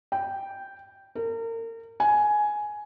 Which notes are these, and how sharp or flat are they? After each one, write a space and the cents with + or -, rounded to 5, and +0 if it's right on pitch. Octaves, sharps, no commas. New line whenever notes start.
G5 -5
A#4 -35
G#5 +10